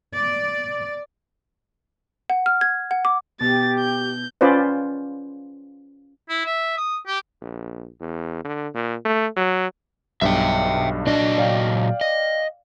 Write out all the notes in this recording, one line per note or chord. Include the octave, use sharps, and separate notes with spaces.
D5
F#5
F6
G#6
F#5
D6
B2 G4 A6
G6
C#4 F4 B4 C5 D5
E4
E5
D#6
G4
A#1
E2
D3
A#2
A3
F#3
B1 G2 E5 G5
A#2 F#3 D4 D#5
D5 F5 G5
D#5